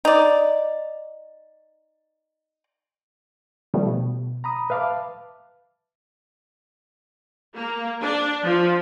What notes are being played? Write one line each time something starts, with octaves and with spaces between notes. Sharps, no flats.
D#4 D5
D#3 F3 G3 A3 B3
B2
A#5 B5 D#6
B4 E5 F5 A5 D6
A#3
D4
F3